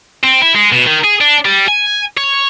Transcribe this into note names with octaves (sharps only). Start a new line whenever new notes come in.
C4
E4
G#3
B2
D#3
G#4
D4
G3
G#5
C#5